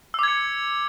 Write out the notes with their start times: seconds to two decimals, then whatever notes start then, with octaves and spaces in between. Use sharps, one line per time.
0.14 E6
0.19 D6
0.23 G#6
0.28 C#7